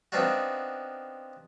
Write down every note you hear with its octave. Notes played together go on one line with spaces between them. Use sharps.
B3 C4 D4 D#4 F4 F#4